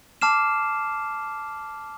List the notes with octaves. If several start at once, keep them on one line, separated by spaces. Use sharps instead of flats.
A5 D6 F6 C7 E7